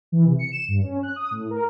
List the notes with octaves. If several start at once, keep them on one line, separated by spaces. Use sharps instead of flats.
E3
C3
C#7
E7
G2
C#4
F#6
D#6
A2
A#4